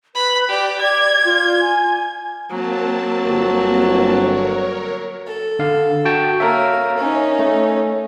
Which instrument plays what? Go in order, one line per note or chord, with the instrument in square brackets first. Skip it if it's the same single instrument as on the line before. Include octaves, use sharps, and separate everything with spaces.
[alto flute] B4 [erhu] B5
[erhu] G4 [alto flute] D5
[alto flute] D5 [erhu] G#6
[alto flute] F4
G#5
[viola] F#3 [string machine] A#3 C4 A5
[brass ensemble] G1
[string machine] A#4 C#5
[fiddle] A4
[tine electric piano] D3 F5
F#4 G5 A5
[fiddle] A#3 [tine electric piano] A#4 C#5 E5
[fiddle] C#4 D#4
[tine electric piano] A3